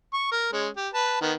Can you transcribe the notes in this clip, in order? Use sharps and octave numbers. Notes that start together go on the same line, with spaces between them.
C#6
A#4
G#3 C#4
G4
B4 A5
D#3 B3